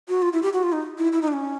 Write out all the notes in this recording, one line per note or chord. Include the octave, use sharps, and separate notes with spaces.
F#4
F4
E4
G4
F#4
F4
D#4
E4
E4
D#4
D4
C#4